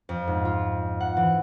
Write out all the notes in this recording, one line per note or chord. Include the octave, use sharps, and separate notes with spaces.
F2
G#2
F4
F#5
E3